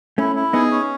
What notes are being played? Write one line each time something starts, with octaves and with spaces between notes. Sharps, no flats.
A3 C#4 E4
E4
B3 D#4 G#4
C#4